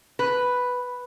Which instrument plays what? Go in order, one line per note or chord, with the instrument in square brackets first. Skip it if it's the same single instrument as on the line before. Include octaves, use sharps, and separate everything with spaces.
[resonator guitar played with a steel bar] B4